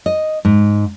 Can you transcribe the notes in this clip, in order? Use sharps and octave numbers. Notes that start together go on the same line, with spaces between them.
D#5
G#2